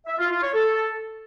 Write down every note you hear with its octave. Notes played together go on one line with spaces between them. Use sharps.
E5
F4
F4
C#5
A4